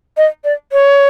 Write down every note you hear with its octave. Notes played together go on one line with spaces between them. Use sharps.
D#5
D5
C#5